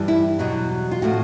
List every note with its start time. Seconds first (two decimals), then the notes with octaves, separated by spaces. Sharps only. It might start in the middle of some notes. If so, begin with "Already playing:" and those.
Already playing: G2 E3 G3
0.08 E4
0.39 E2 B2 F#3 F#4
0.91 F4
1.02 A2 F3 A3 C4 F#4